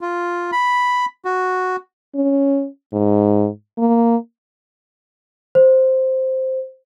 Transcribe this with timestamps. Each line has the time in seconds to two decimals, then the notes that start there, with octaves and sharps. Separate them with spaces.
0.01 F4
0.52 B5
1.25 F#4
2.15 C#4
2.93 G#2
3.78 A#3
5.55 C5